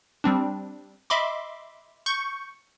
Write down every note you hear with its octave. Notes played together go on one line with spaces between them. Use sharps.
G3 C4 D4
D#5 E5 B5 C6 D6
C#6 G6 C#7